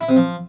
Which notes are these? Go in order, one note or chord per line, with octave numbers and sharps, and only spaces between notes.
E4
C3
F3